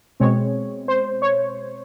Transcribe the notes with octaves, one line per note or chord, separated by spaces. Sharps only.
B2 G#3 C4 C#5
C5
C#5